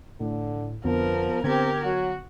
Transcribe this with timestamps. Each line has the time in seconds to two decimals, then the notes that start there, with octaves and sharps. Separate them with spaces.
0.20 A2 D3
0.85 F2 D3 F3 B3 A#4
1.44 D3 B3 C4 G4 A#4 G#6
1.85 F#3 F#4